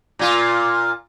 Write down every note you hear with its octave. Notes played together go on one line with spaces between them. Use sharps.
A#2 F4